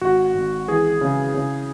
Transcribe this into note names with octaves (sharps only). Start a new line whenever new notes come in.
G#1 F#4
G#1
E3 G#4
C#3
C#3